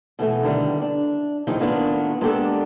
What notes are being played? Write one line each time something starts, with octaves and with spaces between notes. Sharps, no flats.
B2 E3 A3
D3 D#3 G3
D4
A2 D#3 F3 C4 D#4 G#4
A2 D#3 A#3 B3 D4 F4
G#3 A#3 B3 D4 G4 A4